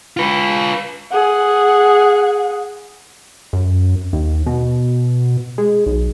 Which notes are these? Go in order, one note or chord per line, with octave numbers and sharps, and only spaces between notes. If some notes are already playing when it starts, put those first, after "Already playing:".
F4 B4
G#4 F#5
F#2
D#2
B2
G#3
B1